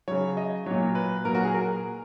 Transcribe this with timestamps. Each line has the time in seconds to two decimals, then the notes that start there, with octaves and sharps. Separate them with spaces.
0.08 C#3 F#3 C#5
0.37 D#5
0.66 A#2 F#3 C#5
0.95 B4
1.25 A#2 F#3 A#4
1.35 F#4
1.45 G#4
1.54 A#4